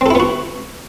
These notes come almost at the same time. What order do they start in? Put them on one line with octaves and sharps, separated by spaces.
C4 A4 E4 B3 F#4